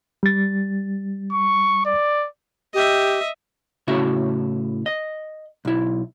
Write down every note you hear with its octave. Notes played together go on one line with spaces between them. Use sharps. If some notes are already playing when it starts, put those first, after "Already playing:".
G3 A6
C#6
D5
G4 D#5 E5
A2 C#3 C#4 E4 F#4 E5
D#5
B1 E4